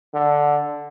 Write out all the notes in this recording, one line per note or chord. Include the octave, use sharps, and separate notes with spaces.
D3